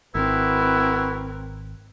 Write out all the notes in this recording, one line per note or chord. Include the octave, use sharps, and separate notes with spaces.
G#1 C4 E4 F#4 A#4 B4